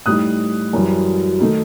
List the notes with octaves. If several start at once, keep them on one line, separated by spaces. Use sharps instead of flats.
A2 G3 D#4 D#6 F#6
F#2 E3 G3
D#3 A3 D#4